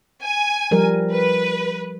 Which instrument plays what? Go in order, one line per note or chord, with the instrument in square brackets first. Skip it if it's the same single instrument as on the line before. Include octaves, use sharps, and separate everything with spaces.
[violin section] G#5
[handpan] F3 G3 A#4
[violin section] B4